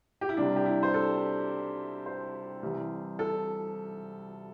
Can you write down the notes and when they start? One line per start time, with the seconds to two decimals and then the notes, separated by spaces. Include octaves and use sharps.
0.21 G4
0.29 E4
0.37 C2 C3 G3 D4
0.56 G4
0.65 E4
0.83 C5
0.94 A4
2.06 C5
2.63 C2 C3 E3 G3
3.19 A4